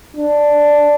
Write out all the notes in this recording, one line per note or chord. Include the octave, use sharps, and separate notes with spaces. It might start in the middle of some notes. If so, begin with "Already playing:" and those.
D4